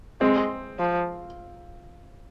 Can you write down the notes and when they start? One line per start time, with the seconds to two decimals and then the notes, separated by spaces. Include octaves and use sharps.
0.21 G#3 C4
0.79 F3